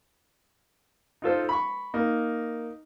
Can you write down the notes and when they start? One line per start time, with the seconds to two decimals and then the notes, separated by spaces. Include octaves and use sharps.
1.22 D#4 F4 A4 C5
1.49 B5 C#6
1.94 A#3 D#4